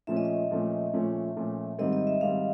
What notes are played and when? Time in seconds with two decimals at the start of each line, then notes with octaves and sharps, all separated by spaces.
0.07 A#2 F3 A3 C#4 E5
0.17 D#5
0.25 E5
0.51 A#2 F3 A3 C#4
0.93 A#2 F3 A3 C#4
1.36 A#2 F3 A3 C#4
1.79 G#2 D#3 G3 C4 D#5
1.93 D#5
2.07 E5
2.21 G#2 D#3 G3 C4 F5